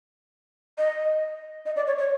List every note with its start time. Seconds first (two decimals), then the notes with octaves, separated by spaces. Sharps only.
0.78 D#5
1.66 D#5
1.76 D5
1.87 C#5
1.98 C#5